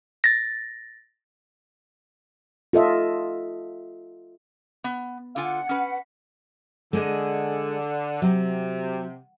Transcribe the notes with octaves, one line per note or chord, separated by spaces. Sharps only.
A6 A#6
F4 A4 D#5 E5
B3
D3 F4 F#5 G#5
C#4 B4
D3 G#3 G#4 D#5
C3 F#3